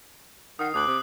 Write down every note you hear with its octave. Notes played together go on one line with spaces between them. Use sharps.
D#3 F#5 D#6 C7
D2 D6 D#6 F#6 F#7
C3